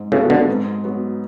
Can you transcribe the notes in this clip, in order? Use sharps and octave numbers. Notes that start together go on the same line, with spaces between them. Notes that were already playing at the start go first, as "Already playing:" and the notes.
Already playing: G#2
A2 C#3 F#3 B3 F#4 A4
B2 D3
G#2
F#3 B3